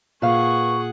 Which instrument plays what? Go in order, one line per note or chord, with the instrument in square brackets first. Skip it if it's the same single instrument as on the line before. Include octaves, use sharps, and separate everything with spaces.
[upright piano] A#2 [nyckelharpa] G#4 F#5 [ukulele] B4 F5 [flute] C#6